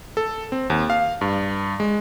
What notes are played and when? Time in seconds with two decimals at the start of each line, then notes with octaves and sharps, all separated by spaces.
0.17 A4
0.52 C4
0.70 D#2
0.90 F5
1.21 G2
1.80 G#3